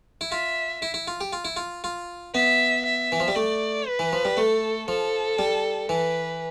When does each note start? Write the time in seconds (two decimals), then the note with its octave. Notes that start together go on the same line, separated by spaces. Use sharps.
0.21 E4
0.32 F4 E5
0.82 E4
0.94 E4
1.07 F4
1.21 G4
1.33 F4
1.45 E4
1.56 F4
1.84 F4
2.34 B3 E5
2.85 E5
3.12 E3
3.20 F3
3.28 G3
3.35 A3 D5
3.87 B4
3.99 E3
4.13 F3
4.25 G3
4.37 A3 A4
4.88 F3 A4
5.39 G3
5.89 E3 B4